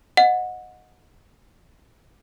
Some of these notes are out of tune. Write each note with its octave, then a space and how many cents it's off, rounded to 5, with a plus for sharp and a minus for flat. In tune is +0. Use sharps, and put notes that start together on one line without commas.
D#5 +0 F#5 -25